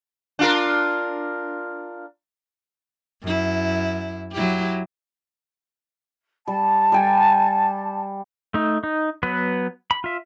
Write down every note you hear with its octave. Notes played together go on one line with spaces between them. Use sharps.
D4 F4 A#4
F#2 E4
F#3 E4 G4
G3 A5
G3 G5 G#5
A3 D#4
D#4
F#3 B3 B4
B5
F4 E5